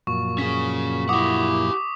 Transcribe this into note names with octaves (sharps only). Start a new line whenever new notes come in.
F#2 A#2 F3 C#6
C#4 G#4 B6
E4 G4 F#5 D6 D#6